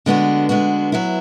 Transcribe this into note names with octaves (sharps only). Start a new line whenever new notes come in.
D3 G#3 B3 F#4
D3 G#3 B3 F#4
F#3 B3 E4